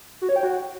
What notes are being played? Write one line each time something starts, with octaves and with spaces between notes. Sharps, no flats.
F#4
C#5
G5
F#4